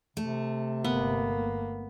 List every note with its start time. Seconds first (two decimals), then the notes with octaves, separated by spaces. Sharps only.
0.17 C3 A3
0.84 G1 A#3 B3